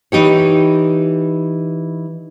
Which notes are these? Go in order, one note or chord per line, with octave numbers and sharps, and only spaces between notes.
E3 D#4 G4 C#5